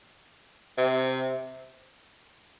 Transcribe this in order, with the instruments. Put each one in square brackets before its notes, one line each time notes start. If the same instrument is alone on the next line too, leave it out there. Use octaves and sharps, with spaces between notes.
[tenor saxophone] C3